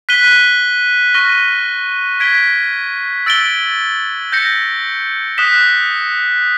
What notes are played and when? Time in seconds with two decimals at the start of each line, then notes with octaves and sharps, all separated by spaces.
0.09 F#6 B6 D#7 G7
1.14 C#6 F6 A#6 D#7 G7
2.20 G#6 B6 D7 G7
3.26 E6 A6 D7 G7
4.32 G6 A#6 C#7
5.38 D#6 F#6 B6 E7 G7